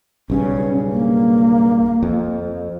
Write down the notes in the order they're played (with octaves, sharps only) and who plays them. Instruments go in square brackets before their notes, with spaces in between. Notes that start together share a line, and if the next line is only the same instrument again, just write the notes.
[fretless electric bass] B1 G2 C#3 [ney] C#4
[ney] A#3
[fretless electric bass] F2